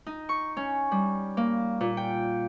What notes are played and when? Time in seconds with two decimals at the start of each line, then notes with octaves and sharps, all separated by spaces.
0.06 D#4
0.29 C#6
0.57 C#4
0.91 G3
1.37 A#3
1.81 A#2
1.97 G5